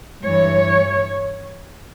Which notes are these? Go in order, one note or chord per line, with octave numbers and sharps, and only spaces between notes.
G2 E3 C#5